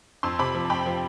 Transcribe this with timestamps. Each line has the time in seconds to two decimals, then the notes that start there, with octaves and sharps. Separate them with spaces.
0.23 F2 C6 E6
0.39 C3 B5 D6
0.55 F3
0.65 A5
0.70 F2 G5 B5
0.86 F3